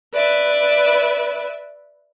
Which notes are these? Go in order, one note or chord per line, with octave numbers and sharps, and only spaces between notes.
B4 D5 E5